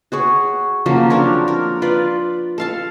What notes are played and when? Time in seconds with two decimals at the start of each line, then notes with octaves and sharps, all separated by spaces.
0.12 F#4 G#4 C#5
0.86 C#3 F3 F#3 A#3
1.10 C4 D4 A#4 C#5
1.48 A#4
1.82 F4 B4 D5
2.58 A4 F5 A5